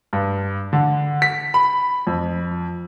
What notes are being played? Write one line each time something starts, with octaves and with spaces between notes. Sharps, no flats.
G2
D3
B6
B5
F2